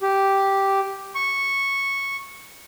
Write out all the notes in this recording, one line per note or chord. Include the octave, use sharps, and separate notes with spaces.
G4
C#6